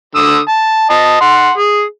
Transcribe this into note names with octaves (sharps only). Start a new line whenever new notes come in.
D3 D#6 E6
A5
D#5 A5
F#5 C6
G#4